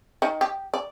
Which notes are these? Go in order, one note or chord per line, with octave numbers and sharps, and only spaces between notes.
D#3
G4
D5